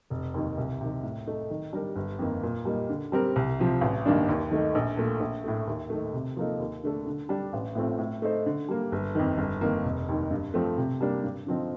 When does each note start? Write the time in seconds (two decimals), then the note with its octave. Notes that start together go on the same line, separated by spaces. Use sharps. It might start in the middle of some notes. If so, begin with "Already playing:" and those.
0.10 F1
0.34 D#2 D#3
0.58 C2
0.81 C3 D#3
1.03 A2
1.26 A3 D#4
1.50 D#3
1.73 G3 D4 G4 A#4
1.96 G1
2.19 F2 D#3 A#3
2.43 A#2
2.65 G3 A#3 D#4
2.89 D3
3.12 G3 C4 G4 A#4
3.36 C2
3.59 C3 F3
3.81 A1
4.06 G2 D#3 A#3 D4
4.28 D#2
4.51 D#3 A3 D#4
4.75 A#1
4.97 A#2 A3
5.20 A#1
5.44 A2 A3
5.67 D#2
5.90 D#3 A3
6.14 C3
6.36 F3 A#3 D#4 A4
6.59 D#2
6.84 D3 A3 D4 A4
7.06 D3
7.29 G3 D4 G4
7.53 A1
7.75 A2 A3 C4 F4
7.99 A2
8.22 A3 D#4 A4 C5
8.46 D3
8.68 G3 A#3
8.92 G1
9.15 F2 D#3
9.38 G1
9.61 F2 D#3 A#3
9.85 F1
10.09 D#2 D#3
10.31 G2
10.54 F3 A3 C4
10.78 C3
11.01 G3 A#3 D4 G4
11.23 G2
11.47 D3 F3 C4 D#4